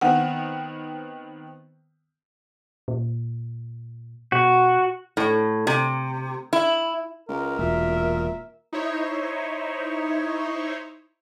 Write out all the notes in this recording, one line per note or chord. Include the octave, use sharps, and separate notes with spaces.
D#3 B3 C4 F#5
A#2
B2 F#4
A2
C3
E4
C#2 A#4
E1 A#2 E5
D#4 E4 C5 C#5